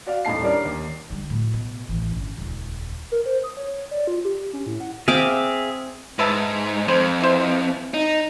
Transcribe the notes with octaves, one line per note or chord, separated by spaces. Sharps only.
F#4 D5 F5
D#1 A2 D#4 A5 C7
G3 C#4 D4 A#4 D5
D#2
D3 G3
A2 F#3
B2
A1 E3
G1 C#4
D#1 C#2
A#4
C5
D#6
C#5
D5
F4
G4
C#4
A2
F#5
C4 G#4 E5 F5 D6
G#2 B4 E5 A5
F2 C5 G#5 B5
E3 C5
D#4